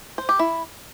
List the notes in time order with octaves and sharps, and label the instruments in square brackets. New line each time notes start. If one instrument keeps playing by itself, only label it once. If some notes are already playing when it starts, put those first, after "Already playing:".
[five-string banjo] C5
G4
E4